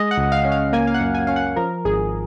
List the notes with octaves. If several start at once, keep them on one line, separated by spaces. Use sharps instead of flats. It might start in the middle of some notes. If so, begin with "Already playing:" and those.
Already playing: G#3 D#5
F#5
C#2
F5
C#4
F5
A#3 G#5
F5
F#5
F#2
G#5
C#4 F5
F#5
F3 A#4
G#1 G#4